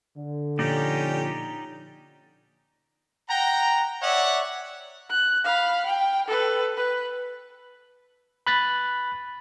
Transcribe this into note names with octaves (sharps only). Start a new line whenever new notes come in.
D3
A#2 F3 C#4 D#4 G4 D5
F#5 G5 A#5
C#5 D5 E5 F#5
F#6
F5 B5
G5
A4 B4
B4
B5 F#6 A6 B6